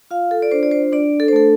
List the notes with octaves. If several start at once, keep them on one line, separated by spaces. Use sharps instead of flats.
F4 F5
A4
D5
D4 C5
D5
C5
D4 D5
A4
C5
A3 A4